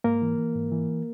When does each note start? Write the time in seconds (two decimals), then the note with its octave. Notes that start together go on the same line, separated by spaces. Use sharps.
0.04 G#2 A#3 A#4
0.22 E3
0.38 E3
0.55 G#2
0.72 E3